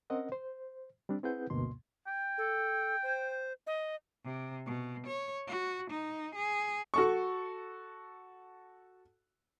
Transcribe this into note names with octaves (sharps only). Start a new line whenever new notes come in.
C4 C#4 A#4 D#5 F#5
C5
G3 C4 D4
C4 E4 G#4 B4 F#5 G6
D2 G2 B2 A#3 C6
G5
A4
C5
D#5
C3
B2
C#5
F#4
D#4
G#4
F#4 A4 C#6